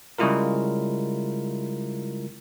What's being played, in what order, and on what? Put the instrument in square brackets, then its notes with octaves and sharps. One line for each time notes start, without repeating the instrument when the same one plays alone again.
[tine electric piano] C#3 G3 G#3 E4 F4 A#4